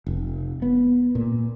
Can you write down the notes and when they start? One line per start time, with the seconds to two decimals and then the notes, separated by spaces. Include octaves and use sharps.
0.07 F1
0.62 B3
1.15 A#2